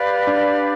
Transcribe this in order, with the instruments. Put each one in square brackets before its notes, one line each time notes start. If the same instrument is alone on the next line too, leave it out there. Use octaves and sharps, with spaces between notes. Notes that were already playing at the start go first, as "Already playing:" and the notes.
Already playing: [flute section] G4 B4 D5 F5
[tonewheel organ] D4